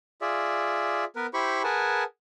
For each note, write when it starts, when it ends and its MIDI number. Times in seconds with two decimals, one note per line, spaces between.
0.21 1.05 65
0.21 1.05 68
0.21 1.05 74
0.21 1.05 76
1.16 1.27 59
1.16 1.27 70
1.16 1.27 71
1.34 1.62 64
1.34 1.62 67
1.34 1.62 72
1.34 1.62 83
1.34 1.62 85
1.64 2.04 68
1.64 2.04 70
1.64 2.04 71
1.64 2.04 78
1.64 2.04 80
1.64 2.04 81